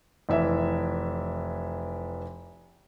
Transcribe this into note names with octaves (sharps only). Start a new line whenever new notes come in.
F1 E3 E5